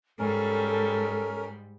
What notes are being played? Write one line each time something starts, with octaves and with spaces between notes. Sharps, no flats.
G#2 G3 C#4 A4 A#4